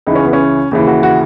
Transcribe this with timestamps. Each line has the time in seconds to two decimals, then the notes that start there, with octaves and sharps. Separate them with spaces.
0.07 C#2 C#3 E3 D#4
0.15 C#4
0.25 B3
0.33 C#4
0.71 D#2 C#3 E3
0.87 F#4
1.03 F#4